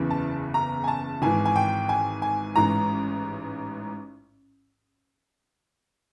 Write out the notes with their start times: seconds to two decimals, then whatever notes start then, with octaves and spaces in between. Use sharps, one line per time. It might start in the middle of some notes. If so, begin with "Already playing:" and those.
Already playing: F#1 E2 C#3 E3
0.10 A5
0.54 A#5
0.84 G#5
0.88 A5
1.22 G#1 G#2 E3 G#5
1.45 G#5
1.56 G5
1.89 G#5
2.22 G#5
2.56 A1 G#2 E3 A#5